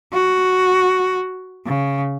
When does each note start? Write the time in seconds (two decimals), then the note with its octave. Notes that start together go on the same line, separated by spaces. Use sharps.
0.13 F#4
1.67 C#3